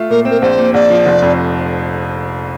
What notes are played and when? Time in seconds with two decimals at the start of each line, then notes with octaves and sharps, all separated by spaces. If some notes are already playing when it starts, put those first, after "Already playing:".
Already playing: A3 F4
0.10 A#2 A#4
0.25 C4
0.30 A#4
0.42 A#1 C5
0.58 A#2
0.74 A#1 D5
0.90 F3
1.05 F1
1.22 F2